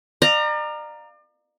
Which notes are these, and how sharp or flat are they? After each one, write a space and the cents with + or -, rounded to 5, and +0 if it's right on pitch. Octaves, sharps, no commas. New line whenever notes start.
D5 +40 F5 +0 A#5 +0